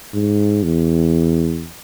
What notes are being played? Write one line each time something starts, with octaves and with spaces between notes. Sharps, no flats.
G#2
E2